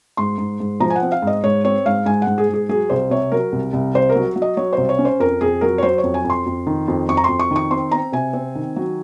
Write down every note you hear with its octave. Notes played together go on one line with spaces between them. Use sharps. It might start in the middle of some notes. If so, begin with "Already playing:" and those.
G#2 C6
G#2
G#2
F3 A#5
G#5
F#5
C4
F5
G#2 D#5
G#2 C#5
C4 C#5
G#2 F5
G#2 G#5
F#5
G#2
G#4
G#2
G#4
F#3 G#4
C2 C5
C3 C#5
F#3 A#4
C2
C2
C2 C5
A#4
F#3
F#3
D#5
F#3 C#5
C5
C2
C#5
C#4
C5
F2 A#4
F2 G#4
F#3 A#4
C#5
F#3 C5
C#5
F2
G#5
F2
C6
F2
D#3
F2
F2 C#6
A#5
F2 C6
C#6
D#3 C#6
C4 C6
C4 A#5
C3 G#5
C4
D#3
F#3